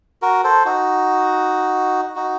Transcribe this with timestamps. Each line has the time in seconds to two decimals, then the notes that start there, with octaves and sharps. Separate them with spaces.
0.22 F#4 A#4
0.44 A4 C5
0.65 D#4 F#4
2.16 D#4 F#4